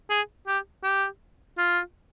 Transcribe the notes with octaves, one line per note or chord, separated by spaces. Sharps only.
G#4
G4
G4
F4